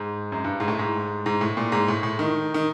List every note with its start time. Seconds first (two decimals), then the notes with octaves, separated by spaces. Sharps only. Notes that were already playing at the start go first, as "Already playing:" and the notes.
Already playing: G#2
0.32 F#2
0.44 G2
0.60 G#2
0.68 A2
0.79 G#2
1.26 G#2
1.41 A2
1.57 A#2
1.72 G#2
1.88 A2
2.03 A2
2.19 D#3
2.54 D#3